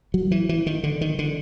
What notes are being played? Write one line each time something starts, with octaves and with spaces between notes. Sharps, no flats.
F#3
E3
E3
D#3
D3
D#3
D3